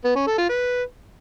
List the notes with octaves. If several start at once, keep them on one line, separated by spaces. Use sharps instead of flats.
B3
C#4
A4
F4
B4